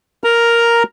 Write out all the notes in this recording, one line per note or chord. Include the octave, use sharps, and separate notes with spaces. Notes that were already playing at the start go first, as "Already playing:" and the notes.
A#4 A#5